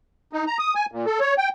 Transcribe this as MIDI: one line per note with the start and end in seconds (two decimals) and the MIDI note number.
0.33 0.45 63
0.47 0.57 82
0.59 0.74 87
0.75 0.86 80
0.92 1.06 46
1.06 1.20 69
1.20 1.35 73
1.38 1.49 79